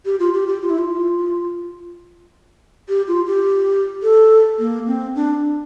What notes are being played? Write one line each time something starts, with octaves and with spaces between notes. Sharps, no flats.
G4
F4
G4
G4
F4
E4
F4
G4
F4
G4
A4
A#3
C4
D4